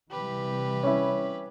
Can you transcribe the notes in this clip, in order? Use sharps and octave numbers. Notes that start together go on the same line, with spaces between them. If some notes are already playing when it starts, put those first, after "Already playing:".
C3 E3 G3 G4 B4
C#4 E4